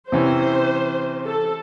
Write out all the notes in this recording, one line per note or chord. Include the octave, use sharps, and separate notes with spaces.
C3 E3 C#4 C5
A4